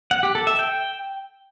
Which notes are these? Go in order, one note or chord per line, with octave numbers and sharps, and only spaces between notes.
F#5
G4
A4
E5
G5